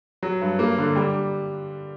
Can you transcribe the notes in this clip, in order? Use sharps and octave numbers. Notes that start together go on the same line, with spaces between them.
F#3
G2
A#3
D3
G3